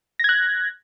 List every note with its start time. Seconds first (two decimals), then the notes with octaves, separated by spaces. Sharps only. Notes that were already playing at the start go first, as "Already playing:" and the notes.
0.19 A#6
0.24 G#6
0.29 F#6